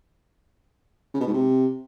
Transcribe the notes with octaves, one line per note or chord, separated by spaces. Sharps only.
C#3
B2
G#2
C3